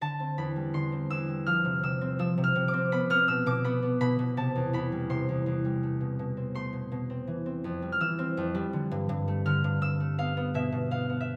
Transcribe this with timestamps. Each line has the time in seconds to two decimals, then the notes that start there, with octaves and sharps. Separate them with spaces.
0.01 D3 A5
0.20 C4
0.38 E2 B5
0.56 G3
0.74 D3 C6
0.92 C4
1.10 E2 E6
1.28 G3
1.46 F3 F6
1.65 C3
1.83 C3 E6
2.01 C4
2.19 F3 E6
2.38 C3
2.44 F6
2.55 C3
2.68 D6
2.73 C4
2.92 B3 B5
3.10 B3 F6
3.28 B2 E6
3.46 B2 D6
3.64 B3 B5
3.82 B3
4.01 B2 B5
4.19 B2
4.37 C3 A5
4.56 E2
4.73 E2 B5
4.92 G3
5.10 C3 C6
5.29 E2
5.46 E2
5.65 G3
5.83 A3
6.01 B2
6.19 B2
6.37 C4
6.55 A3 C6
6.73 B2
6.92 B2
7.10 C4
7.27 E3
7.46 C4
7.64 F2
7.82 G3
7.92 F6
8.00 E3 E6
8.19 C4
8.37 F2
8.55 G3
8.73 D3
8.91 G2
9.09 G2
9.28 A3
9.46 D3 F6
9.64 G2
9.81 G2 E6
10.00 A3
10.18 B3 F5
10.37 B3
10.54 B2 E5
10.72 B2
10.91 B3 F5
11.09 B3
11.21 E5